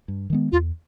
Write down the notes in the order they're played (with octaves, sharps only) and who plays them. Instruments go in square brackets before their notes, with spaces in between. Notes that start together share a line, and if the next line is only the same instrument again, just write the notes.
[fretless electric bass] G2
D#3 G#3 B3
[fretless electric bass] E2 [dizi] F4